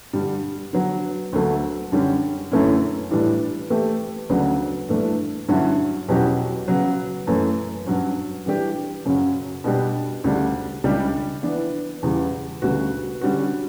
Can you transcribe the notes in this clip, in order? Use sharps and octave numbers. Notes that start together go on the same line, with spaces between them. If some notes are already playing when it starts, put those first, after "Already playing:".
G2 D3 G3
D3 F#3 B3
D2 D3 F#3 A3
F#2 D3 G3 C#4 G4
F#2 D3 A3 C#4 E4
A2 E3 G3 D4
E3 A3 E4 G4
D2 C#3 F#3 B3 D4
G2 E3 A3 D4
G2 D3 F#3 C#4 E4
E2 B2 F#3 C#4 G4
C#3 F#3 B3
F#2 E3 A3
G2 F#3 C#4
E3 G3 D4 G4
F#2 C#3 F#3 C#4
B2 G3 D4 G4
D2 C#3 G3 D4
C#2 C#3 G3 D4 G4
E3 B3 D4
E2 C#3 E3 G3
D2 C#3 G3 B3 F#4
D3 G3 C#4 F#4